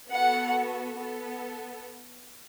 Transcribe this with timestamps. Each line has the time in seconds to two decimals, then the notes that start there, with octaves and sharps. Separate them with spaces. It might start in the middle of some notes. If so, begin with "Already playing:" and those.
0.11 B3 F#4 A4 F#5
0.97 B3 A4